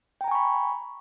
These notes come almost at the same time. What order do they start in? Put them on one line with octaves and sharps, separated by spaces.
G5 A#5 G#5 C#6 B5